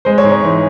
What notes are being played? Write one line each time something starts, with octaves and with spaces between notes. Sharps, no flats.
G#3 C5
C#5
G#2
C#5
E3